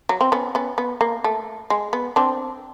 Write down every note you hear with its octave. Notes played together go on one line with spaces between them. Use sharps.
F#3
C4
B3 C#4
B3 C#4
B3
A#3
A3
G#3
B3
C4 D4